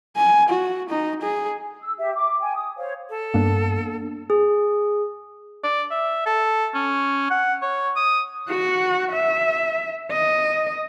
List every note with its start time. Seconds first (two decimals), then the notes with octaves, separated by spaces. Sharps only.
0.17 G#5
0.49 F#4
0.90 D#4
1.22 G#4
1.82 E6
1.98 G4 E5
2.15 D6
2.40 G5 G#5
2.55 D#6
2.77 C5 C#5 F5
3.10 A4
3.34 G2 A#3 B3 D4
4.30 G#4
5.63 D5
5.91 E5
6.26 A4
6.75 C#4
7.31 F#5
7.62 C#5
7.96 D#6
8.49 F#4 F#5
9.12 E5
10.12 D#5